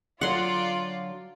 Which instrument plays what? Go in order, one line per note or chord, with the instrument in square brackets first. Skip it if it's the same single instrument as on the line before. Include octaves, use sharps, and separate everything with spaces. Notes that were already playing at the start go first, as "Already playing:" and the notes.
[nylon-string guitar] D3 F#3 D#5 [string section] F4 D5 [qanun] F#5 C6